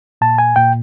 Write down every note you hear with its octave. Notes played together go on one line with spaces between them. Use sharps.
A#2 A5
G#5
A#2 G5